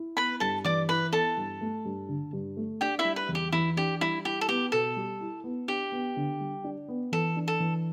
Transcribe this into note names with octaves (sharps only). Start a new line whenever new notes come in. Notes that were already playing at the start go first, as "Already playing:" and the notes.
Already playing: E4
B3 B4 B5
G2 A4 A5
E3 D5 D6
E4 B4 B5
B3 A4 A5
G2
A3
G2
D3
G2
A3
D4 G4 G5
E4 E5
G3
B4
E2
G4
E3 E4
D4 G4
G3 E4
E4 G4
A4
B3 G4
B2 A4
G3
E4
B3
D4 G4
B3
D3
G3
D4
B3
E3 A4
D4
A4
E3